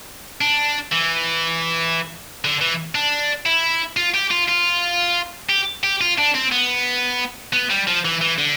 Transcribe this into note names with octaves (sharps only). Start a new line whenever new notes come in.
D4
E3
D3
E3
D4
E4
F4
G4
F4
F4
G4
G4
F4
D4
C4
B3
B3
G3
F3
E3
E3
D3